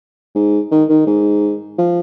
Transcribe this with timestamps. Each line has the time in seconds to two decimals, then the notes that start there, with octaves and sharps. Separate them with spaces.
0.35 G#2
0.72 D#3
0.89 D#3
1.07 G#2
1.78 F3